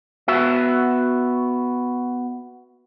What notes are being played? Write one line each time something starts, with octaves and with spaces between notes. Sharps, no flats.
B3 F#4 E5